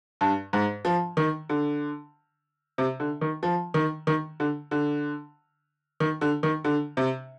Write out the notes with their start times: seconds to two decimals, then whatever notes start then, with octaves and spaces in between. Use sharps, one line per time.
0.21 G2
0.53 G#2
0.85 F3
1.17 D#3
1.49 D3
2.78 C3
3.00 D3
3.21 D#3
3.43 F3
3.74 D#3
4.07 D#3
4.40 D3
4.71 D3
6.00 D#3
6.21 D3
6.43 D#3
6.65 D3
6.97 C3